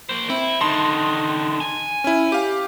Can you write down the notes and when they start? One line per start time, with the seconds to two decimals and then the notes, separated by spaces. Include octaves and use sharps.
0.09 A#3 C5
0.30 C4 E4
0.61 D3 D#3 A5 C6
1.60 G#5
2.04 C#4 E4
2.32 G4 F5